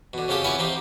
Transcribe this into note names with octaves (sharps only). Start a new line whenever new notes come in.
B2 D3
F2 C#3 C#4 G4 A4 D#6
B3 C#4 E4 B4 F#5 G#5
C4 D#4 G4